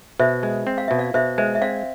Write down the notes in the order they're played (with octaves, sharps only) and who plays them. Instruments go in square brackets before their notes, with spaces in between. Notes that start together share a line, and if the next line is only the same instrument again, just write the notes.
[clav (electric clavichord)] B2 [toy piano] C5 E5
[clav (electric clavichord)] G#3
C4
[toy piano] F5
[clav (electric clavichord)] B2 [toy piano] E5
[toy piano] D5 F5
[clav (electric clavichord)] B2 [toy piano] C5 E5
[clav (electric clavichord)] G#3 [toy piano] C5 E5
[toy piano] E5
[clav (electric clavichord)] C4 [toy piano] D5 F5